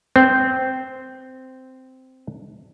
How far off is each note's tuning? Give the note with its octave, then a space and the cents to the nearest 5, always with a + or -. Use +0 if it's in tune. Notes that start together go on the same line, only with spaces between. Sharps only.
C4 -10